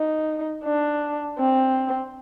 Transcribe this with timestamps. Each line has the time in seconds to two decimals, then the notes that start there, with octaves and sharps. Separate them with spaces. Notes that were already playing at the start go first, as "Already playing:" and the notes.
Already playing: D#4
0.64 D4
1.39 C4